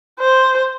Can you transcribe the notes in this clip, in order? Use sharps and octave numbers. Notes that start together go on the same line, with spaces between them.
C5